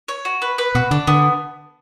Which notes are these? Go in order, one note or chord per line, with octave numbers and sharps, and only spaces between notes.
C#5
F#4
B4
B4
B2 F#4
D3 D4
D3 B3